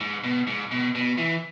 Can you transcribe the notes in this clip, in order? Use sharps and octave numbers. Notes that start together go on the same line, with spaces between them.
G#2
B2
G#2
B2
B2
E3